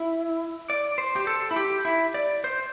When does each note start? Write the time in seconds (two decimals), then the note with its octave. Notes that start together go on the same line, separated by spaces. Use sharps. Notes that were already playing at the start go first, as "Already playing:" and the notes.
Already playing: E4
0.70 D5
0.98 C5
1.16 G4
1.27 A4
1.51 E4
1.56 G4
1.85 E4
2.14 D5
2.44 C5